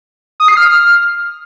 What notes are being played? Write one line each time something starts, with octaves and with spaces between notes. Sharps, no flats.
D#6
C7
F6